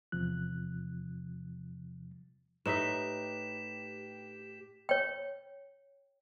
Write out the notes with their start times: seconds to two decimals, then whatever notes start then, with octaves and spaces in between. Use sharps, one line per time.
0.12 E2 C3 F3 F#6
2.66 A2 D#4 G4 B4 E5 B6 E7
4.89 C#5 G5